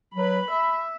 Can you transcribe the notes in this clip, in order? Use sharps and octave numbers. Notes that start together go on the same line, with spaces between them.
F#3 B4 B5
E5 B5